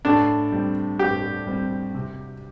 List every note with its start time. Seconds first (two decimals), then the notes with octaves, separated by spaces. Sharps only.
0.05 A2 D4
0.52 G3 C4
0.99 A2 G4
1.47 G3 C4
1.95 C3